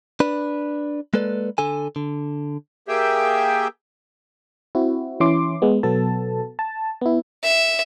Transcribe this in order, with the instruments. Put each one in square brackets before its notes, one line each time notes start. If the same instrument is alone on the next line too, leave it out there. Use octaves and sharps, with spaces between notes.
[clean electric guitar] D4 B4
G#3 A#3 A4 B4 D5
D3 A4 G#5
D3
[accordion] A#3 G4 G#4 E5 G5
[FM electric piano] C4 E4 F#4
E3 C#4 E4 C6 D6
G#3 B3
B2 F#3 B3 A4 A5
A5
B3 E4
[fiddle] E5